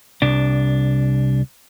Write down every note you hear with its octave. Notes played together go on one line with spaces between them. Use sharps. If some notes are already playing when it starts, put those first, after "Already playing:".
C2 D4